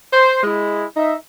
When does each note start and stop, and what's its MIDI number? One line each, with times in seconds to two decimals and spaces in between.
0.13 0.41 72
0.43 0.86 56
0.43 0.86 64
0.97 1.15 63
0.97 1.15 76